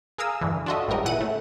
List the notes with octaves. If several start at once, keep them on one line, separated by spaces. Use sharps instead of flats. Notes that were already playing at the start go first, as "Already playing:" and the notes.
G#4 A#4 F5 D#6 E6
G2 D3 E3
D4 F4 F#4 A4 D#5 E5
G#1 A2 C#3 G3 A#4 D#5
A#2 E3 E4 F#5 D#7
C#3 A3